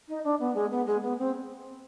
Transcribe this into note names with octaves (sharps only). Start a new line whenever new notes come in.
D#4
D4
B3
G#3
B3
G#3
B3
C4